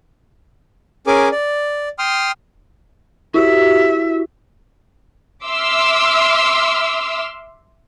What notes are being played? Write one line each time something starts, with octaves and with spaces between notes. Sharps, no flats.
C#4 G#4 A#4 G#5 D6
D5
G5 C6 D#6 F6
E4 F#4 G4 E5
E5 C6 D6 E6 F6